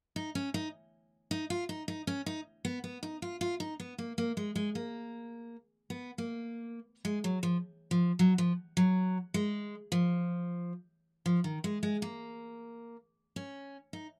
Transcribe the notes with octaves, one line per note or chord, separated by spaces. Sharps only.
D#4
C#4
D#4
D#4
F4
D#4
D#4
C#4
D#4
B3
B3
D#4
F4
F4
D#4
B3
A#3
A#3
G#3
G#3
A#3
B3
A#3
G#3
F#3
F3
F3
F#3
F3
F#3
G#3
F3
F3
D#3
G#3
G#3
A#3
C#4
D#4